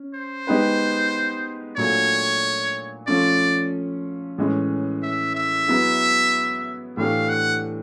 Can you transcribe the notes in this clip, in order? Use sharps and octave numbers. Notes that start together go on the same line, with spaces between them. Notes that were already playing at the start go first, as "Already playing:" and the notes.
Already playing: C#4
C5
G#3 B3 D#4 G4 B4
A#2 F#3 A3 D4 F#4 C#5
F3 A3 C#4 D5
A2 E3 G#3 C#4
E5
E5
F#3 B3 E4 G#4
A2 E3 A3 D4 G4 F5
F#5